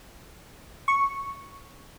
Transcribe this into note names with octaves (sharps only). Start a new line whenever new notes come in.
C#6